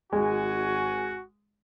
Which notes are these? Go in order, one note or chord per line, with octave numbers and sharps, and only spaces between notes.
G#1 G#3 F#4 G#5